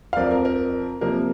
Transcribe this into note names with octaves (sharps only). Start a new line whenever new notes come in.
F5
F2 F3 C4 A#4 D5
A#4
A#4
C3 F3 A#3 A#4